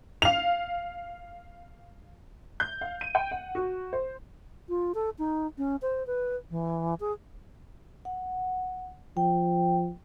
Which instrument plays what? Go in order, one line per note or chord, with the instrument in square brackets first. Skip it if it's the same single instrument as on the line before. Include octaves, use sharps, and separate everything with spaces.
[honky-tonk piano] F5 F7
G6
F5
D#7
G5
F#5
F#4
C5
[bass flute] F4
A4
D#4
C#4
C5
B4
E3
G#4
[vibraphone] F#5
[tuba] F3 [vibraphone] G5